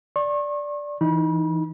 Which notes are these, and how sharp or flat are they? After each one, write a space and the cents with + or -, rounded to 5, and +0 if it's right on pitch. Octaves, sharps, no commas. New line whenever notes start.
D5 -5 C#6 -40
E3 +0 D#4 +0 B5 -35